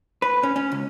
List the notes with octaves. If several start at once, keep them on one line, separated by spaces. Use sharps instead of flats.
B4
C#4
C#4
C#2